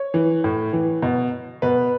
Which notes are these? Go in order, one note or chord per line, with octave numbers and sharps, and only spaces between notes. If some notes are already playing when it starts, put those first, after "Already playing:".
Already playing: C#5
E3
A2
E3
B2
B2 B4